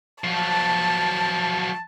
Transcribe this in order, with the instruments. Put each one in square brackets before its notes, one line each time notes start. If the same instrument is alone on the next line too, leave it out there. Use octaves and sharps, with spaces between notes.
[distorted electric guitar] F3 F#3 [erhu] A5